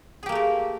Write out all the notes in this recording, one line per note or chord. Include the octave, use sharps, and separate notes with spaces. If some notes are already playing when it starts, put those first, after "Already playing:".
A3 A#3 G4 G#4 A#4